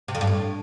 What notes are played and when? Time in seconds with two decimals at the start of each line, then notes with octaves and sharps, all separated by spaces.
0.08 C3
0.15 F2
0.21 G2
0.27 A2